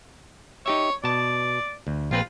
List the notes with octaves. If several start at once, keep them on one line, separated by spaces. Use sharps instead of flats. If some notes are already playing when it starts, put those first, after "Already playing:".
D#4 G4 C#5 E5
B2 D5 A5
D2
A#1 C4 F4 B4